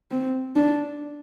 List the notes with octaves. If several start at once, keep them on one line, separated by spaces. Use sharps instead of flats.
C4
D4